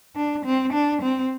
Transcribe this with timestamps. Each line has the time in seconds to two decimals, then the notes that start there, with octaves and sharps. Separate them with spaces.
0.16 D4
0.45 C4
0.73 D4
1.02 C4